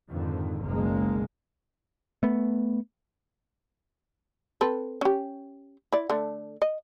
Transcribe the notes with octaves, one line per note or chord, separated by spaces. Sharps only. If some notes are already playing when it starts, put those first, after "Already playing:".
F2 G#2 D3 D#3
F#1 B1 G#3 A#3
A3 B3
C4 A4 B4
C#4 G4
E4 D5
D3 A3
D#5